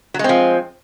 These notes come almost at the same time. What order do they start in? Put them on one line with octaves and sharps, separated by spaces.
F#3 G#3 C4 F3